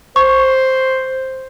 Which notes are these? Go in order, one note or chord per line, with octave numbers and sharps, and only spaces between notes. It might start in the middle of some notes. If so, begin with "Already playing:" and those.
C5 C#6